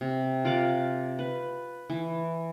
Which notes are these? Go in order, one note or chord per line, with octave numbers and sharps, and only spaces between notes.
C3
F4 A#4 F#5 D6
B4
E3